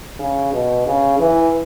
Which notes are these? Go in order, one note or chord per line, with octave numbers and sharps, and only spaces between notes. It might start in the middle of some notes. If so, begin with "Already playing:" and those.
C#3
B2
C#3
E3